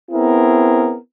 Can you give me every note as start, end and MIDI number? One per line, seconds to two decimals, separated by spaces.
0.11 0.96 59
0.11 0.96 60
0.11 0.96 64
0.11 0.96 68
0.11 0.96 70